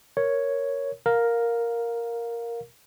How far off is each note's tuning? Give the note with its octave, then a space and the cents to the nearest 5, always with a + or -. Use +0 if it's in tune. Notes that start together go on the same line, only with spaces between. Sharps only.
A#4 +0 C#5 +0
A#4 +0 F5 +20